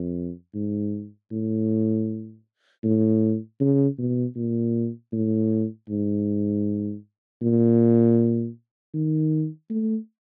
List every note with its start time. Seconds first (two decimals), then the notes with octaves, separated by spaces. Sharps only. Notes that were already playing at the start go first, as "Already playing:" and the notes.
Already playing: F2
0.54 G#2
1.32 A2
2.83 A2
3.60 C#3
3.99 B2
4.36 A#2
5.13 A2
5.89 G#2
7.42 A#2
8.94 D#3
9.70 A3